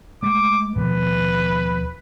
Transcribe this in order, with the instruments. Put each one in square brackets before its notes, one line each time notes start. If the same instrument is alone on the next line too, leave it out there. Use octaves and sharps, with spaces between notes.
[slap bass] G#3 A3 [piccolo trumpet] D6
[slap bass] D#2 B2 F3 [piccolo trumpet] B4